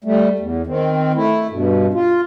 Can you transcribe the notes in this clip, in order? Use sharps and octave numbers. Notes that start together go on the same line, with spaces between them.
G3 A3
E2
D#3 C4
A3 E4
G2 B2
F4